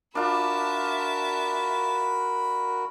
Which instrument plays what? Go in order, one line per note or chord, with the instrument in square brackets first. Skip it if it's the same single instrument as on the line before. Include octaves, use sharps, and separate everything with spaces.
[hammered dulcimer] D4 F4 D6 [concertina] F#4 A#4 [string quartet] E5 A5 [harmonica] B5